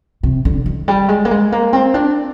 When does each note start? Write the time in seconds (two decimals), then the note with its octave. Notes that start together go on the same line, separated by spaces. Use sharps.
0.23 C3
0.45 D3
0.66 D#3
0.88 G3
1.08 G#3
1.25 A#3
1.31 G#3
1.52 A#3
1.73 C4
1.94 D4